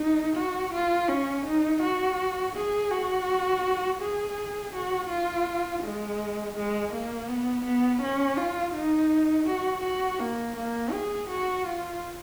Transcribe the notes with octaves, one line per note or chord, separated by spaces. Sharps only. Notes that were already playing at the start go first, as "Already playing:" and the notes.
Already playing: D#4
F#4
F4
C#4
D#4
F#4
G#4
F#4
G#4
F#4
F4
G#3
G#3
A#3
B3
B3
C#4
F4
D#4
F#4
F#4
A#3
A#3
G#4
F#4
F4